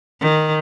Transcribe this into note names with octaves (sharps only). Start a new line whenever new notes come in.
D#3